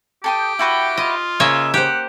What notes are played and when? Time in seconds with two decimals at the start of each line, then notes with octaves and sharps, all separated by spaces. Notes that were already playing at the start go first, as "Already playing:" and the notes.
0.24 G4 A4 G5 D#6
0.59 E4 F#4 B4 G5
0.98 F4 D#5
1.40 C#3 A#3 C#5 D#5 E5
1.74 G4 C5 F#5